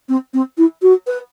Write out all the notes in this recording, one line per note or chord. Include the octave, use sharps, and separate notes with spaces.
C4
C4
E4
F#4
B4